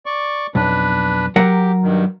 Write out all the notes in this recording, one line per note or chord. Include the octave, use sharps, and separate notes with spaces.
D5 C#6
B1 F2 D4 B4
F#3 G4 A#4 F#5
G2 D#3